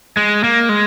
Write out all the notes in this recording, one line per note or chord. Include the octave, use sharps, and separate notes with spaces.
G#3
A#3
G#3